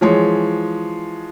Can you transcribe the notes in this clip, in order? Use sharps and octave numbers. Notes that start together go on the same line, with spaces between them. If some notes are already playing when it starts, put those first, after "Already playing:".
E3 F3 G#3 C#5